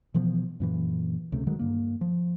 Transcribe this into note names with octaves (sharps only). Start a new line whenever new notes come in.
B2 E3 F3 B3
F#2 A#2 E3
C#2 C3 A3
D3 D#3 F#3 G#3
G2 A#3
F3